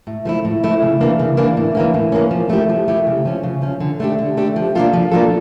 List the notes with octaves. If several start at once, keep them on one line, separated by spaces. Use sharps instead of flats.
A2
F3 A3 E4
A2
F3 A3 E4
C#3
E3 A#3 D4
C#3
E3 A#3 D4
A2
E3 A#3 C#4
A2
E3 A#3 C#4
F3
A3 E4 G4
F3
A3 E4 G4
C#3
F3 C#4
C#3
F3 C#4
D3
A3 D4 G4
D3
A3 D4 G4
F3
A#3 D4 F4 A4
F3
A#3 D4 F4 A4